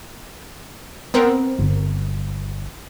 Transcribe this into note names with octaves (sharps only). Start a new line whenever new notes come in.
B3 C4 A#4
G1